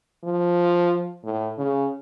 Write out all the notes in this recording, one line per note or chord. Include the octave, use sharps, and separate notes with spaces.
F3
A2
C#3